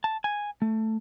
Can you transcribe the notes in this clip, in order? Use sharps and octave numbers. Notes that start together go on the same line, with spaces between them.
A5
G#5
A3